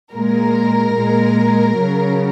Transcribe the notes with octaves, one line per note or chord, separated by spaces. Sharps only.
A#2 G#3 A#4
A#2 G#3
C#3 F#3